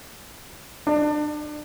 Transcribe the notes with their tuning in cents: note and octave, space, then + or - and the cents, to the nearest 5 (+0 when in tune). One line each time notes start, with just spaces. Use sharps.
D4 +30